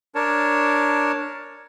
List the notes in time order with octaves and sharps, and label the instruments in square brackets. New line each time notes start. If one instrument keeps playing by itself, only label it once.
[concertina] D4 A#4 C#5 A5